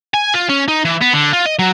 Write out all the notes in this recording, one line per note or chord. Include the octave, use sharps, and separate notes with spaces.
G#5
F4
C#4
D#4
E3
B3
D3
F4
D#5
F#3